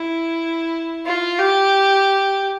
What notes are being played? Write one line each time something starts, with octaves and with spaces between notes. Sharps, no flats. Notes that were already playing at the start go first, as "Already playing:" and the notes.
Already playing: E4
F4
G4